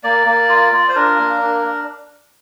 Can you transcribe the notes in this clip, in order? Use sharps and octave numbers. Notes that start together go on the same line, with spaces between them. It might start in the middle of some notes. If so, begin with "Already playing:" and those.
A#3 D5
A#3
F4
F4
C5
D4 A#4
A#3
D4